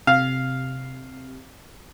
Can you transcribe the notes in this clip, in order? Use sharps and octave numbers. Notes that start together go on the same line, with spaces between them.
C3 F5